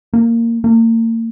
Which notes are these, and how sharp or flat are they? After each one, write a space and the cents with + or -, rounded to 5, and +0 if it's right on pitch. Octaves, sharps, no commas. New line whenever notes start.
A#3 -15
A#3 -40